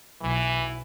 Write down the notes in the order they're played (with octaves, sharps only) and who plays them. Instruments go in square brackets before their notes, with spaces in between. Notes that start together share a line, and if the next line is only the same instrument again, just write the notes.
[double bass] B1 [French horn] E3